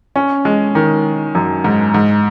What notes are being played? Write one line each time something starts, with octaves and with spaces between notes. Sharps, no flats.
C#4
G#3
D#3
F#2
G#2
G#2